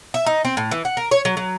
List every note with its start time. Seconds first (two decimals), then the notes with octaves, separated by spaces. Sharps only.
0.14 E5
0.26 D#4
0.45 C4
0.57 A2
0.71 E3
0.85 F#5
0.97 A#4
1.11 C#5
1.25 F#3
1.37 F#3